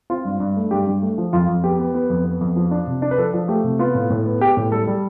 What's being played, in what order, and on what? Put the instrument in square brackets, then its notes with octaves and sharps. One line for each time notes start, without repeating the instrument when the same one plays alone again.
[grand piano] C4 F4
G2
G2
A3
G2 G4
G2
A3
F3
F2 F4
F2
B3 G4
B3
B3
F2
B3
F2
F3
D4
C3
D4
B4
F3 A4
F3
A3 G4
C3
B3 F4
A2
A2
B3
B3 G4
A2
G3 A4
G3